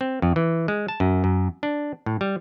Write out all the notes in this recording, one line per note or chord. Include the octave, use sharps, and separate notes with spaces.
C4
F2
E3
G#3
A5
F#2
F#2
D4
A2
G3